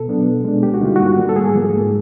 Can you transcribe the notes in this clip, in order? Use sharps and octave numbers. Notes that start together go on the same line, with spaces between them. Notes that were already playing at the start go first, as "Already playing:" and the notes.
Already playing: B2 A4
F#3 B3 D4
B2
G#3 B3 D4
D2 G4
F#4
D3 G3 A#3 D#4 F4
G2 F#4
D3 G3 A#3
A4
G#2 G#4
F3 A#3
G#2